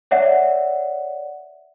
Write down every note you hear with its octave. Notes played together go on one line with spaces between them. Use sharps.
C#5 D5 E5 F#5